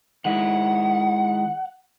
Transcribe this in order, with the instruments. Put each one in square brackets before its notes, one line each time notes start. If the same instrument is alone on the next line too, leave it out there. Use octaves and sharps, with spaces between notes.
[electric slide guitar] D#3 G#3 E4 [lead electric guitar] F#5